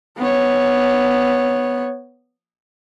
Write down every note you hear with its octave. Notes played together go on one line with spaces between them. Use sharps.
B3 C#5